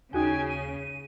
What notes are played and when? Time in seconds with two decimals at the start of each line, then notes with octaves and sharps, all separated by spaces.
0.13 D#2 C#3 D#4 F#4 G5 G#5
0.49 D#7